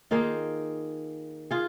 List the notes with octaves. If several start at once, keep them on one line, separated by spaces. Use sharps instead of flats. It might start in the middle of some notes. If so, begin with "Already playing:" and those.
D#3 A#3 D#4 F4 G#4
F4 G#4